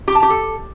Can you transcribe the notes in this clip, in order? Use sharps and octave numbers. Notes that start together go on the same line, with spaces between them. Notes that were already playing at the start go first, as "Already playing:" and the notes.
G4
A5
G4
A4